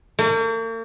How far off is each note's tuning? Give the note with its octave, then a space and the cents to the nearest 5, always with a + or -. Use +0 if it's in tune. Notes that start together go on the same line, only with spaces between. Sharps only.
A#3 -45